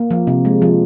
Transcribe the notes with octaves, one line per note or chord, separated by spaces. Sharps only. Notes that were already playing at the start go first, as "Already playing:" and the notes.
Already playing: A#3
F3
C3
G#3
F3